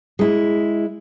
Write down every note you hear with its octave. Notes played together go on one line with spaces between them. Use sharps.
G#3 E4